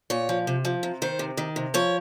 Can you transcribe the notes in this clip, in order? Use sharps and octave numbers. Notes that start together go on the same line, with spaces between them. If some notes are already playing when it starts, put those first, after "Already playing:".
A#2 C#5
F3
C3
F3
C3
D#3 C5
C3
D#3
C3
F3 C#5